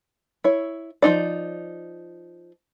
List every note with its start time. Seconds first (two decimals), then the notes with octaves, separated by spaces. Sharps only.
0.44 E4 C#5
1.02 F3 C4 D#4 D5